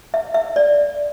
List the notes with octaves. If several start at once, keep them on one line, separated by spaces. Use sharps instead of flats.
E5
E5
D5